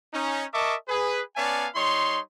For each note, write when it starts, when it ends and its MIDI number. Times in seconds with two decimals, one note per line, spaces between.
0.13 0.44 61
0.13 0.44 63
0.53 0.74 70
0.53 0.74 75
0.53 0.74 76
0.53 0.74 81
0.53 0.74 85
0.53 0.74 86
0.88 1.21 68
0.88 1.21 71
1.36 1.67 59
1.36 1.67 61
1.36 1.67 74
1.36 1.67 77
1.36 1.67 80
1.36 1.67 81
1.75 2.18 55
1.75 2.18 63
1.75 2.18 73
1.75 2.18 84